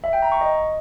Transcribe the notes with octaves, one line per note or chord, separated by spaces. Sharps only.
E5
G5
A#5
C#6
D#5